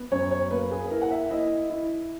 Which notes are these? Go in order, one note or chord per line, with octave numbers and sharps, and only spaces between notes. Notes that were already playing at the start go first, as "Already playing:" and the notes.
Already playing: B3
F#2 C#5
C#5
A#3 B4
G#4
E4 A#4
F#5
E5
E4 D#5
E4